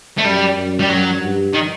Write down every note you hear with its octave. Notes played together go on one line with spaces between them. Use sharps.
A3
F#2 G3
F#2
G3
F#2 F#3
G2
D#3